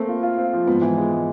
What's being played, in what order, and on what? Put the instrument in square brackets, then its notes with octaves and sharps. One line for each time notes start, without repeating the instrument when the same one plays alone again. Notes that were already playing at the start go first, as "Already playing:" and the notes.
Already playing: [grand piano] A3 C4 [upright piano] A#3
[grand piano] F4
F4
C4
F3
[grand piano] G#2 [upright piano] B3
[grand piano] E3
G#3
G#3